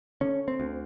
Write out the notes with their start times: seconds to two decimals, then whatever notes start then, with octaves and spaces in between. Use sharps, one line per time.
0.21 D3 C#4
0.48 C4
0.60 D2